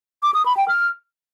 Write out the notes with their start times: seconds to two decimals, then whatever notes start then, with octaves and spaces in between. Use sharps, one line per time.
0.23 D6
0.34 D#6
0.46 B5
0.57 G5
0.68 F6